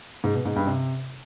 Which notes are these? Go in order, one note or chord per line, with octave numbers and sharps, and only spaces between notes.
G#2
B2
G#2
G2
C3